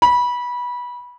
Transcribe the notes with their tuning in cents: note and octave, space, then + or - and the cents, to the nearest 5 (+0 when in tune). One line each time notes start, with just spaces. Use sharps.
B5 -20